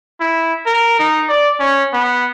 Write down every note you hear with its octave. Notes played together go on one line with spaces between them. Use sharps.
E4
A#4
D#4
D5
C#4
B3